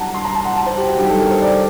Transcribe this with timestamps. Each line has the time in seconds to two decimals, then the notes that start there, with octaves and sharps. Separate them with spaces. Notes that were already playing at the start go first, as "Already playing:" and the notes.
Already playing: G2 F#3 F#5 A5 A#5
0.14 C6
0.25 A#5
0.35 A5
0.45 F#5
0.57 A5
0.66 C5
0.78 G4
0.88 F#4
0.98 G2 D#3 F#3 G4
1.09 A4
1.20 A#4
1.31 C5
1.42 D5